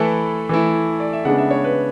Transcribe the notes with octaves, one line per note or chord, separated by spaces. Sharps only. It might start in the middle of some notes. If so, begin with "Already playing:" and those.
Already playing: E3 A3 E4 A4 B4
E3 A3 E4
D5
E5
C#3 G#3 B3 D4 F#5
E5
C#5
B4